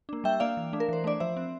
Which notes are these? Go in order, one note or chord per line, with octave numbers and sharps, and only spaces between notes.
A#3 D4
G3 E5 G5
A#3 D4 D5 F5
E3
A3 D4
A#4
E3 C5
A3 D4 D5
F3 C5 E5
C4